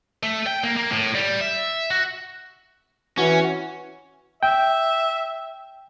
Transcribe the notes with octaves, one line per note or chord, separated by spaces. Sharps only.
A3
G5
A#3
A#3
A2
G3
E5
F#4
E3 C#4 F#4
E5 G5